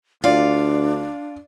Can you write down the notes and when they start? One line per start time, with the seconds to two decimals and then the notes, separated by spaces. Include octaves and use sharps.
0.24 D2 D4 F4 D5 F5